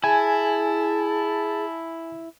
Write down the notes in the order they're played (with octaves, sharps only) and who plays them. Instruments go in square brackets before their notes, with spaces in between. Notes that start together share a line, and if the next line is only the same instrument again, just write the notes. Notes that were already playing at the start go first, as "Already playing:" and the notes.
[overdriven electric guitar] E4 [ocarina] G#4 [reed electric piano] G#5 [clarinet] A5